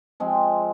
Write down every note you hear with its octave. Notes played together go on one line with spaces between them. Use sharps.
F3 G#3 C4